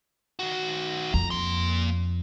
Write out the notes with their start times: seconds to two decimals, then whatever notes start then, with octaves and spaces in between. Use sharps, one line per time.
0.39 D#3 F#4
1.14 F2 A#5
1.31 A#3 C6